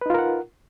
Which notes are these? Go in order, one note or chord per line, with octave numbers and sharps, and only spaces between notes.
D#4 F4 A#4 B4 F#5